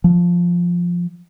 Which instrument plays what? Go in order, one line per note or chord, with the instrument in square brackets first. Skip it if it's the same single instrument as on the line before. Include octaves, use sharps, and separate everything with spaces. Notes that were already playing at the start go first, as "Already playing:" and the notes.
[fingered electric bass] F3